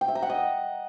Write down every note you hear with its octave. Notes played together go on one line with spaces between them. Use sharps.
G5
E5
A#5
F#5
D#5